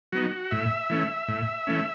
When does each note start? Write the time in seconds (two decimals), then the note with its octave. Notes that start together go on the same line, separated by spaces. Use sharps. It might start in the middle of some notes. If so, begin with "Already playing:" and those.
0.12 F#3 B3 D#4 F#4
0.51 A2 E5
0.90 E3 A3 C#4
1.28 A2
1.67 E3 A3 C#4